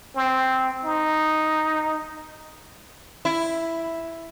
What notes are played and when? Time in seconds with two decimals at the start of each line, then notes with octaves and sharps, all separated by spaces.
0.15 C4
0.84 D#4
3.25 E4